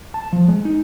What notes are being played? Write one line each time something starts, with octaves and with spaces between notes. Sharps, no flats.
A5
F3
G#3
D#4